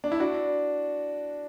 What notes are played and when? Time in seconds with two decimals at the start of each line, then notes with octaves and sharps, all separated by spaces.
0.04 D4
0.12 E4
0.20 D4 F#4